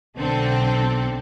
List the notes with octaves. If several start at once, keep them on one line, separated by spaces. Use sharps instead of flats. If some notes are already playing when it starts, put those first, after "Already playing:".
B1 D3 C4 A4